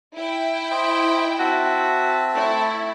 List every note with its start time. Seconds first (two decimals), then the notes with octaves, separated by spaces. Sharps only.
0.15 E4 G5
0.71 C5 D#5 B5
1.39 C4 F#4 E5 A5
2.36 A3 E4